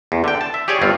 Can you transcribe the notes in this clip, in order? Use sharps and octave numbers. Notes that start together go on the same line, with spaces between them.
E2
D3 G5
A5
E5
G4 G#4 C#5 D5
G1 G2 C4 F4